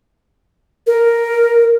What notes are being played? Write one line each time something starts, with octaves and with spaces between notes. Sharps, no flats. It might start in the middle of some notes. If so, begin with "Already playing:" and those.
A#4